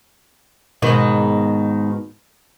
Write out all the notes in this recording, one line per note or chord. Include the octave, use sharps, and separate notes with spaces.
G#2 B2 D#3